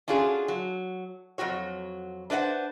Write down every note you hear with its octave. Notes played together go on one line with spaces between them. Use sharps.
C#4 D4 F4 F#4 G#4
F#3
F2 F#3 F#4 C#5
D4 B4 C5 D#5 F#5